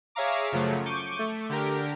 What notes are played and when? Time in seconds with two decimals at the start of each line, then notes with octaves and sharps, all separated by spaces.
0.15 G#4 C#5 E5 F5 A#5 D6
0.52 F#2 C#3 F3 F#3 A3
0.86 C#6 D6 G6 D#7
1.19 A3
1.49 D3 G4 A#4